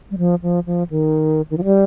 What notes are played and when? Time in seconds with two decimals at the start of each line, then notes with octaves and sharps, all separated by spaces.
0.11 G3
0.18 F3
0.43 F3
0.66 F3
0.90 D#3
1.50 D#3
1.58 F3
1.64 G3